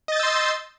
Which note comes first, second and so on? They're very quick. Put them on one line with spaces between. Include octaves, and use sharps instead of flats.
D#5 A6 G6 E6 C6